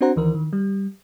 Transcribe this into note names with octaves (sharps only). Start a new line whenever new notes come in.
C4 D4 F#4 C5 F#5 A#5
D2 D#3 E3 A#4
D#3
G3